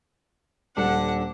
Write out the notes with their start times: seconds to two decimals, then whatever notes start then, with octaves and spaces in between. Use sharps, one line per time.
0.77 D#1 D4 A4 F#5